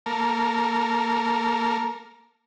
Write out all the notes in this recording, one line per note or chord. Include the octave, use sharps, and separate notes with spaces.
A#3 A4 A#4